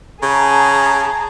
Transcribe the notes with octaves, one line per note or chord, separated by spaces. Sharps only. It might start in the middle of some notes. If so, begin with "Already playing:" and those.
C#3 G#4 A5 A#5